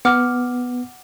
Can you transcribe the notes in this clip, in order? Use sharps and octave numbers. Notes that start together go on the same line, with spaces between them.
B3 F#5 D6 F6